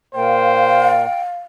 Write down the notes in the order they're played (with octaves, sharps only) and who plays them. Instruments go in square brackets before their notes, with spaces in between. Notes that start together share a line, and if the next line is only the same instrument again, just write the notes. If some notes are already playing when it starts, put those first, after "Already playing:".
[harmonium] A#2 A#3 [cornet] C5 [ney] F5 [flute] G5